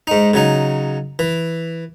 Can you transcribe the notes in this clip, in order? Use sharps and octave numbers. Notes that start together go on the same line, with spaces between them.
G#2 D#4
C#3 F#3 D#4
E3